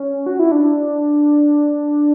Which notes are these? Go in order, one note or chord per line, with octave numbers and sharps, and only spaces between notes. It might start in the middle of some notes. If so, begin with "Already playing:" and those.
Already playing: C#4
F#4
E4
D4